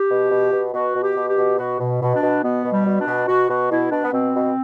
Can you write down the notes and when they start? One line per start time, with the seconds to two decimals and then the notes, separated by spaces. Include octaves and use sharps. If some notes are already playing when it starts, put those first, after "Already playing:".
Already playing: G4
0.09 B2
0.30 B2
0.51 B2
0.72 B2 F#4
0.94 B2
1.01 G4
1.15 B2
1.28 G4
1.36 B2
1.57 B2 F#4
1.79 B2
2.00 B2
2.13 D4
2.21 B2
2.42 B2 B3
2.63 B2
2.70 G3
2.84 B2
2.99 D4
3.06 B2
3.27 B2 F#4
3.48 B2 F#4
3.70 B2 E4
3.90 B2 D4
4.04 B3
4.11 B2 C4
4.33 B2